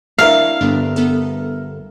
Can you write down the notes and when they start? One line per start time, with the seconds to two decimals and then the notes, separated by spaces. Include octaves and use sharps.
0.18 D4 E4 A#4 E5 F5 C#6 A#6 C#7
0.61 G1 B3 D4
0.96 B3 A4